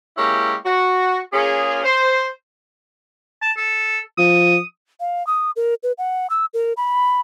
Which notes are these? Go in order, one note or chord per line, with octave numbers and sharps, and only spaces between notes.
G#3 A#3 C#4 E4 G4
F#4
A#3 C#4 F4 G#4
C5
A5
A4
F3 D#6
F5
D#6
A#4
B4
F#5
E6
A#4
B5